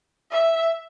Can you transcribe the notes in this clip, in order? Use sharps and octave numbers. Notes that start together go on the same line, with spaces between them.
E5